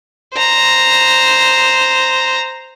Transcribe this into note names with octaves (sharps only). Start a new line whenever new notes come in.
C5 A#5